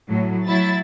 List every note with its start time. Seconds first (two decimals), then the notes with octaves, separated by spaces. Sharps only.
0.10 A2 F#3
0.46 F#3 E4 A6